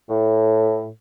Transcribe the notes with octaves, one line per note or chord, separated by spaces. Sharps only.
A2